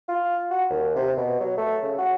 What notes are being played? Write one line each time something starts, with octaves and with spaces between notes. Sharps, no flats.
F4
F#4
D#2
C3
B2
F#3
A3
C#3
F#4